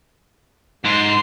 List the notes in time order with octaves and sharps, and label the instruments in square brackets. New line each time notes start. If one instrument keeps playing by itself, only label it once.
[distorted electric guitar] G#2 [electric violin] C6